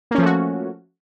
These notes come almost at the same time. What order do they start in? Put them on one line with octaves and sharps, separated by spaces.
A#3 C#4 F3 A3 F#4